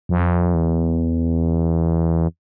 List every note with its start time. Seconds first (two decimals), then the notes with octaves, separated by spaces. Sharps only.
0.09 F2
0.54 E2